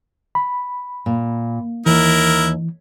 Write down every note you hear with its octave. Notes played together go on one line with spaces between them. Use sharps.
B5
A#2
D#2 E3 E4 A#4